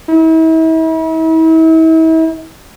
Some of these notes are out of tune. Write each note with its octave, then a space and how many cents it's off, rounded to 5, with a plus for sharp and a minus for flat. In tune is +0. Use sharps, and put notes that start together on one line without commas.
E4 -40